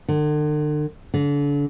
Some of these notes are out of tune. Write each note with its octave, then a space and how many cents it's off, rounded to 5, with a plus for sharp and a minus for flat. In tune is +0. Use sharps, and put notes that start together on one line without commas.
D3 +40
D3 -35